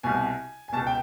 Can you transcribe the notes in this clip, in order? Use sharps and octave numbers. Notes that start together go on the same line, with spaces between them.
C2 B2 G#5
G#5
C#2 B2 A5
G5